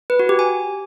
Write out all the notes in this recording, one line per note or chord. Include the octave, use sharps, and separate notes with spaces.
B4
F#4
G4
G#5